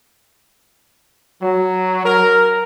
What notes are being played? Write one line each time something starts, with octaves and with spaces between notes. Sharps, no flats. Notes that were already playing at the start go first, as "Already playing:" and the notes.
F#3
A#4